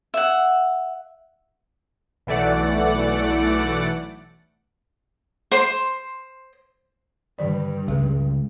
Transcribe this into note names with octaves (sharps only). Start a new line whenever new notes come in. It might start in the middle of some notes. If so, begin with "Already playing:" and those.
E5 F#5
B1 E3 A3 D5 F#5
C5 C6
G2 D3 D#3 D5
C#2 G#3 G#4